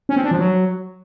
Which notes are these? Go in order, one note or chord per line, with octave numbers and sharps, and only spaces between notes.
C#4
C4
D4
F3
F#3